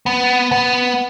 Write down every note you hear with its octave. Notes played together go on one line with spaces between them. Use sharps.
B3
B3